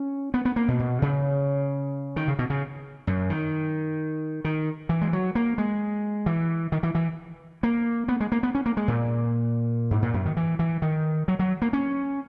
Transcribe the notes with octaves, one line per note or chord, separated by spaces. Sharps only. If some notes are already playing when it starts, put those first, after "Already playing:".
Already playing: C#4
B3
B3
A#3
B2
B2
C#3
D#3
C#3
B2
C#3
F#2
D#3
D#3
E3
G#3
F#3
A#3
G#3
E3
D#3
E3
E3
A#3
B3
G#3
A#3
B3
C#4
A#3
G#3
A#2
G#2
A#2
F#2
D#3
E3
E3
D#3
F#3
F#3
A#3
C#4